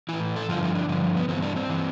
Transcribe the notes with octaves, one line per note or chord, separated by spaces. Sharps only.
A2 E3 E4
A4
G2 D3 F3 F4
E4
D4
G2 D3 F3
B3
G2 E3 C4
D4
C4
E3